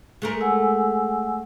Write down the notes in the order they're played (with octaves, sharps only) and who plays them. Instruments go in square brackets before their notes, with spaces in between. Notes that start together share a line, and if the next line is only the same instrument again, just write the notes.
[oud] G#3 A3 A#4
[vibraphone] F#5 G#5 E6